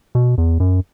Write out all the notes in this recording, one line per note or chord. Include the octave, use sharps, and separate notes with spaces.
B2
E2
F#2